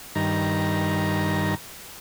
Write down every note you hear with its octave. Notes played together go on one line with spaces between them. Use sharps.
G2 D#3 A#5